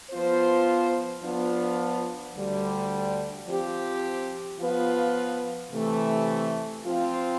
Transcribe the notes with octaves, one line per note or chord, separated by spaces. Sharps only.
F3 B3 F4 C5
F3 B3 D4 F4
D2 D3 G3
F3 C4 G4
F3 B3 F4 B4
C3 E3 A3
F3 C4 F4